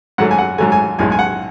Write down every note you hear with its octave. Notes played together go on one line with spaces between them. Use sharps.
G#2 F#3 A3 F#5
G#5
F#5
G#2 F#3 A3 G#5
G#5
B1 A2 G#3 G#5
G#5
F#5